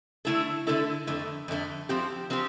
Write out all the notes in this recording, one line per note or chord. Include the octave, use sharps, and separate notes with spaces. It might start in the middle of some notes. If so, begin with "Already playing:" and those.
D3 A3 E4 A4
D3 A3 E4 A4
F2 D3 A3
F2 D3 A3
F3 C4 G4
F3 C4 G4